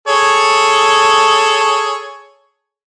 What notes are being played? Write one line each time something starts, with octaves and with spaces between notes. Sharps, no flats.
G#4 A4 C#5